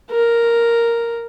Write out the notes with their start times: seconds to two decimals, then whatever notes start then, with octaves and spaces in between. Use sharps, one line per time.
0.11 A#4